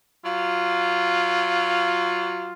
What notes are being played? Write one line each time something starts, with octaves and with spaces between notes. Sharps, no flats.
F#3 F4